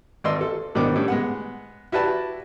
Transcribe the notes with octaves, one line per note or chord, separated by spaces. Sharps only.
G#1 D5 D#5 C6 E6
A4
G#2 B2 D#3 B3 D4 D6
A2 G3 C#4
G#3 B3 F#5
E4 F#4 G4 B4 D5 A5